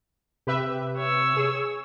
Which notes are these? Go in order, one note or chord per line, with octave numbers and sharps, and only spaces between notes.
C3 G4 B4 E5
C#5 E6
G#4